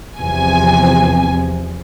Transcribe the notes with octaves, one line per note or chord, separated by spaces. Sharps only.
E2 C3 F3 G#5